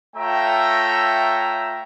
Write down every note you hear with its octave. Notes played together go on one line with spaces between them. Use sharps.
A3 F4 C#5 E5 G5 A#5